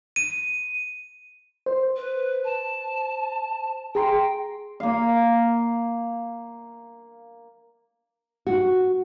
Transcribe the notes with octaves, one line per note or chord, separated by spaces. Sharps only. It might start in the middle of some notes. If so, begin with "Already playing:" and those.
D#7
C5
B4
A5
G#4 G5 A#5 C6
A#3 F5
F#4